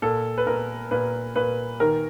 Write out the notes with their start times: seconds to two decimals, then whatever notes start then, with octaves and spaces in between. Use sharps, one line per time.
0.02 A#2 A4
0.38 B4
0.46 A#2 A#4
0.91 A#2 B4
1.36 A#2 B4
1.80 D#3 A#4